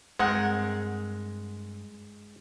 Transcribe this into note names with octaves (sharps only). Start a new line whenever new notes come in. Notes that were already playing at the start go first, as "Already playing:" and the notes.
G2 G#3 C4 A#4 F#5